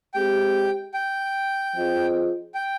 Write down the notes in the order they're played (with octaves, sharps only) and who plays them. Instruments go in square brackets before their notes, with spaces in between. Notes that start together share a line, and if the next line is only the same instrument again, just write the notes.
[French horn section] G#3 C4 G4 [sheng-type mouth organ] G5
[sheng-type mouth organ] G5
[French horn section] F3 C4 F4 G#4 D#5
[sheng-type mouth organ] G5